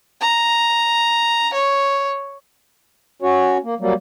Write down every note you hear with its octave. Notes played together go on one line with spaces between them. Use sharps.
A#5
C#5
C#4 F#4 C#5
A#3
F#3 G3 A#3